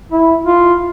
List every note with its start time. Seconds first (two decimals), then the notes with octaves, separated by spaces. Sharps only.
0.12 E4
0.45 F4